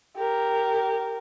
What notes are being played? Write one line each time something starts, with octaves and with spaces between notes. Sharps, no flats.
G4 A#4